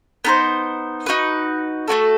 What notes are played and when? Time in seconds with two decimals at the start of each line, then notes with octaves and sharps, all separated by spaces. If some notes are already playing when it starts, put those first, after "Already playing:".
0.25 B3 D#4 A4 C5
1.06 D#4 F#4 B4
1.88 A3 C4 F#4 A4